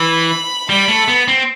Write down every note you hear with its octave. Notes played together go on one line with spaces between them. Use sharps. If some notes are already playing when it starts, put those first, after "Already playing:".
Already playing: E3 B5
G3 B5
A3
B3
C4